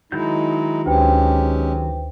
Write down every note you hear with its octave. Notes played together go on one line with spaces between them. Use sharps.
D#3 F#3 G#3 D#4 E4 G6
D2 G#3 C#4 G4 B4 C5 G5